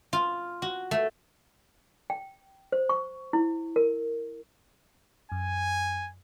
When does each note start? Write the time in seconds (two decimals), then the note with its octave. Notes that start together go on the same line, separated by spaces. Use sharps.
0.13 F4
0.62 F#4
0.91 A3
2.10 G5
2.72 C5
2.89 C#6
3.33 E4
3.76 A#4
5.32 F#2 G#5